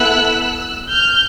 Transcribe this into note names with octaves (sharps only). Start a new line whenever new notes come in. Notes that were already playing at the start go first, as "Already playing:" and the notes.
Already playing: B3 E4 A4 E6 F#6
F6 G6